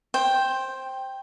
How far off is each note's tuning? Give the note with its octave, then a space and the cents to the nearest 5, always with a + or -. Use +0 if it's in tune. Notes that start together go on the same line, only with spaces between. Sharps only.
C5 +15 G5 +0